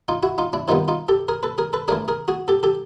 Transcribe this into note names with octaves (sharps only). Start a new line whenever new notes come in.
D#4 F4
E4 F#4
D#4 F4
D4 E4
C3 D#3 G3 B3 D#4 F4
D#4 F4
G4 A4
G#4 A#4
A4 B4
G#4 A#4
A4 B4
E3 A3 D4 G#4 A#4
G#4 A#4
F#4 G#4
G4 A4
G4 A4